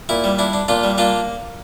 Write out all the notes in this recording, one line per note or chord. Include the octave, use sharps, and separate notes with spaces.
A#2 E4
G3
D4 E4
D4
A#2 D4 F4
G3
A#3 D4 F4